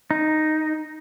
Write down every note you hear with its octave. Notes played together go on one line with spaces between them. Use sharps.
D#4